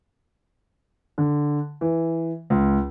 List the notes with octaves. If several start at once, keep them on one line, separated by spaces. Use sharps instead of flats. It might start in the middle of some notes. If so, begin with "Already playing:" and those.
D3
E3
C#2